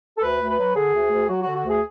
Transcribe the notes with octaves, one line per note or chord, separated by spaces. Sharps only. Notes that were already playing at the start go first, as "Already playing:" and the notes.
A4
D2 B4
D2
B4
F#3
D3 G#4
D2
D2
F#3 F#4
F#4
D3
F#4
D2 G#4